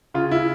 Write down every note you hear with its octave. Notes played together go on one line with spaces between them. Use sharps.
C#3 F4
E4